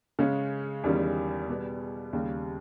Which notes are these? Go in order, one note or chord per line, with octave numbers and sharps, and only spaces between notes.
C#3 G#3 C#4
E2 D#3 G3 C#4
B2 G3 B3
D#2 C#3 G3